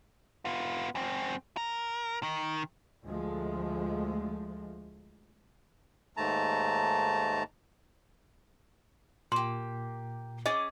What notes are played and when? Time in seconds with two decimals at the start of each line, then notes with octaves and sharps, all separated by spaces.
0.45 B3 F4
0.95 F#2 C4
1.57 A#4
2.23 D#3
3.05 D2 F3 G#3 A3
6.17 D#2 G#2 A3 A5 A#5
9.32 A#2 A#3 G4 C6
10.46 C#4 G#4 D#5 D6